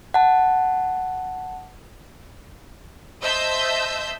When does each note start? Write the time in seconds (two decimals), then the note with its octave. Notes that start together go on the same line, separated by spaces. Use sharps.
0.14 F#5 A5
3.23 C5 D#5 E5 A5 E6 G6